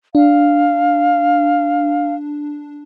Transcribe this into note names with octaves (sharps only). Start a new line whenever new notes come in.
D4 F5